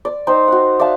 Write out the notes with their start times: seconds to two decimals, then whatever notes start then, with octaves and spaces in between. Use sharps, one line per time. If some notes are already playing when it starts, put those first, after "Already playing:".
0.05 D5
0.27 D#4 C5 G5 A#5
0.48 F#4 F#5
0.79 D5 E5 F5 A5